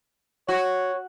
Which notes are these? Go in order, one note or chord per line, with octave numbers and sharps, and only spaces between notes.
F#4 C#5